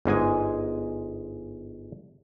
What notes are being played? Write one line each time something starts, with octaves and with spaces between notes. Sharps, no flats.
G1 G#2 G#3 G#5